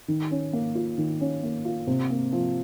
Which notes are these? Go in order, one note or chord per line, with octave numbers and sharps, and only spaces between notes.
D#3
C#4
A#3
F4
D#3
C#4
A#3
F4
C3
A#3
F3